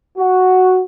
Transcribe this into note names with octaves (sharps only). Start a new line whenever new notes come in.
F#4